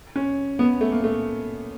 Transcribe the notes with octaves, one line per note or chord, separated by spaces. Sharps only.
C#4
B3
A3
A#3
A3